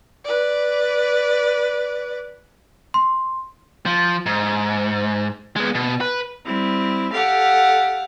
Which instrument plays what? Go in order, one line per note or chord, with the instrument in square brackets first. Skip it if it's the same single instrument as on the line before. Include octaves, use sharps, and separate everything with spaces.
[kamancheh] B4 D5
[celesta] C6
[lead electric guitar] F3
G#2
G#3 B3
B2
B4
[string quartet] G3 C4 E4
G4 A4 F5 F#5